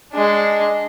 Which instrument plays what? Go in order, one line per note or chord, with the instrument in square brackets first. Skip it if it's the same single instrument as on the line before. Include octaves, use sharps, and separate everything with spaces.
[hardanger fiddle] G#3 D4